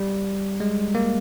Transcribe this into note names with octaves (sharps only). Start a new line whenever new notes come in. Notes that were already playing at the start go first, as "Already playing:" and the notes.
Already playing: G3
G#3
A#3